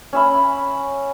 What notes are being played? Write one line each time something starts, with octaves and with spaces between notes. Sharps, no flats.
C#4 E5 B5